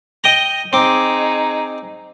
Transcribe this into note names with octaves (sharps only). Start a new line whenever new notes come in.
D#5 G5 A#5
C4 D#4 G#4 D6